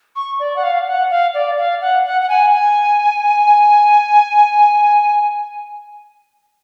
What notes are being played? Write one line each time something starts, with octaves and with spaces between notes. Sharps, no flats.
C#6
D5
F#5
F5
F#5
F5
D5
F5
F#5
F#5
F#5
G#5
G#5